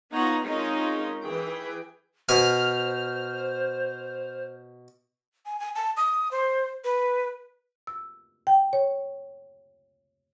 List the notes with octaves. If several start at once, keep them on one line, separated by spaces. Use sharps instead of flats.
B3 D#4 F4 C#5 F#5 A#5
G#3 C4 C#4 D#4 F4 A#4
E3 G#4 G5
B2 C5 G#5 F6
G#5
G#5
A5
D#6
C5
B4
E6
G5
C#5